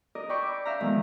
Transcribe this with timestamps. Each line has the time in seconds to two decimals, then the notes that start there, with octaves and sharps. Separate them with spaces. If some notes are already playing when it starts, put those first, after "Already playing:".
0.15 A#4 D5 D#5
0.29 D5 G5 B5 C#6 E6
0.43 D6
0.65 E5 F5 G5 A#5
0.80 D#3 F3 G#3 A3 B3